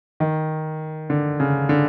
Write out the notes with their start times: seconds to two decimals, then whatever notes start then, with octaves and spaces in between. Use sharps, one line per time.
0.20 D#3
1.10 D3
1.40 C#3
1.69 D3